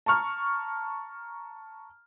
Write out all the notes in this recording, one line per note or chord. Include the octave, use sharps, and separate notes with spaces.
A5 A#5 C#6 F6